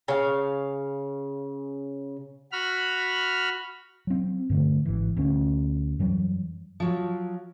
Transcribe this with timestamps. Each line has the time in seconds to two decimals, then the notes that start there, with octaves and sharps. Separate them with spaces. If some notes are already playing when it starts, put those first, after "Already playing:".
0.08 C#3 F5
2.52 F#4 B5 F6
4.07 F#3 C4
4.50 G2 D3 A3
4.85 G#1 E3
5.17 D2 D3 C#4
5.99 F#2 E3 F#3 G3
6.80 F3 F#3